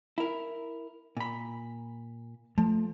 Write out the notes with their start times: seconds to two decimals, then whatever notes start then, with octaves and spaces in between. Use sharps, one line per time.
0.18 E4 A#4
1.17 A#2 B5
2.58 F3 A3